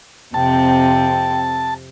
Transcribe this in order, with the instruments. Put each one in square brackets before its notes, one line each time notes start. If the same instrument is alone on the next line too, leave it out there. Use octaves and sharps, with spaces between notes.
[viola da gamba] F2 C3 C4 [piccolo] G5 [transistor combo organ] A5